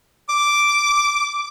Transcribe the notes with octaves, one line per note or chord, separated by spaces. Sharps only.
D6